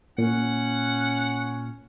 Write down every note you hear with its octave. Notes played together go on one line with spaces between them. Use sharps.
A#2 C#4 F#5